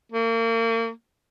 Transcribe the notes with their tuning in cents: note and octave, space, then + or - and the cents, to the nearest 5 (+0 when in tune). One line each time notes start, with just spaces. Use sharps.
A#3 -35